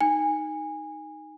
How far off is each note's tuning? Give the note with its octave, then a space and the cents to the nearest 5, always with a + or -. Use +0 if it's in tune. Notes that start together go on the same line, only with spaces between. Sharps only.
D#4 +0 G#5 -20